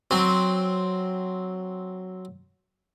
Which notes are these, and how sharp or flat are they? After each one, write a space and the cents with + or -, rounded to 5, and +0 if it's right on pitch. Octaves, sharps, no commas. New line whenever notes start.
F#3 +0 C4 +0